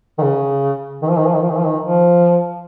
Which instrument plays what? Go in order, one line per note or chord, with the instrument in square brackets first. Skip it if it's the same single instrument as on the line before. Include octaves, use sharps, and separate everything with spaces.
[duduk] D#3
C#3
D#3
F3
D#3
F3
D#3
F3
D#3
F3
D#3
F3